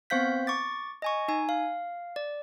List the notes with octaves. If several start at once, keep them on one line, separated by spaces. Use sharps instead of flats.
B3 C4 C5 F5 G6 B6
C#6 D6 A6
D#5 G#5 C#6
D#4 G#5
F5
D5